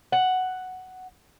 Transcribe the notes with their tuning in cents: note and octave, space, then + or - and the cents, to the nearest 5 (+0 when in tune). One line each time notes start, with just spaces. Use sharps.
F#5 +5